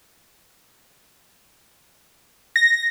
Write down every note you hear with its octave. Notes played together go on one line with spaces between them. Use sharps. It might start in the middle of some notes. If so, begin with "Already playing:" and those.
A#6